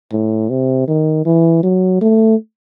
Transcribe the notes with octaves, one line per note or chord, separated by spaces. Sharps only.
A2
C3
D#3
E3
F#3
A3